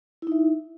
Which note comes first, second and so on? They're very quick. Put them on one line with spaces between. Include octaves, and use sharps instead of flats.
E4 D#4 E5